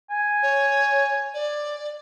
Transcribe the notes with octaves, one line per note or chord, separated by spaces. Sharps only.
G#5
C#5
D5